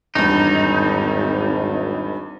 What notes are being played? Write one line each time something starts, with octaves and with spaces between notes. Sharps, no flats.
G#1 E2 G2 D#4